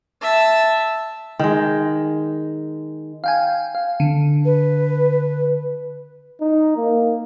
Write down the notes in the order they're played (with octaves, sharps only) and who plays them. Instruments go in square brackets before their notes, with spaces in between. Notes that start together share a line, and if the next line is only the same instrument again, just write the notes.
[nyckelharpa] E5 A5
[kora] D#3 G#3
[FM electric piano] F5 G5 G#5
F5
D3
[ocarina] B4
[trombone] D#4
A#3